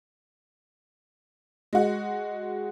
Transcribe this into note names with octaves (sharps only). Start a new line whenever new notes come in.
G#3 F#4